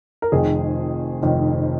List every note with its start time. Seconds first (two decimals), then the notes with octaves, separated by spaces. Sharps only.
0.22 A#4
0.32 F1 F2 D#3 G#4
1.22 F1 F2 D#3